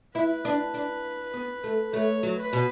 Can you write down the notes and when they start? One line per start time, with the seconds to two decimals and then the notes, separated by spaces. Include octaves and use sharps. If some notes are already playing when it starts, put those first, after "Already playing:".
0.15 E4 B4
0.45 D4
0.74 D4
1.34 B3
1.64 A3
1.93 A3 C#5
2.23 F#3
2.38 B4
2.53 B2